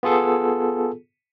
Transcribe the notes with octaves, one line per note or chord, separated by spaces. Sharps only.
B3 F4 G#4 A4